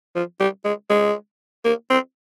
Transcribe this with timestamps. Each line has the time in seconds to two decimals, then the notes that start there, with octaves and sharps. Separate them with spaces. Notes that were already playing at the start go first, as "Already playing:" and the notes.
0.15 F3
0.40 G3
0.65 G#3
0.90 G#3
1.65 A#3
1.90 C4